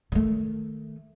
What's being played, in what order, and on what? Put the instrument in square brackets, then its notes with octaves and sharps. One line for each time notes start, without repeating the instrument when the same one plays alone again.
[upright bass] D#3 A3